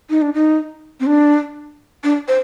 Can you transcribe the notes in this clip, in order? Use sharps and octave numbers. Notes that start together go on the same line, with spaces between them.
D#4
D4
D#4
C4
D4
D4
C5